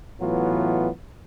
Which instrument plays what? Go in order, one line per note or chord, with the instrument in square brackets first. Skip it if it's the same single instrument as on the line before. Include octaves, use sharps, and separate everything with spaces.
[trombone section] A2 E3 F#3 B3 F4